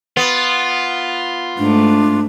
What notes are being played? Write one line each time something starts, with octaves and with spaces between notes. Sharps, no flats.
B3 F4
G#2 A3 D4